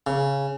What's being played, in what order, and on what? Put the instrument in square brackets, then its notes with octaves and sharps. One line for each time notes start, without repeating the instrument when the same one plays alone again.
[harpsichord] C#3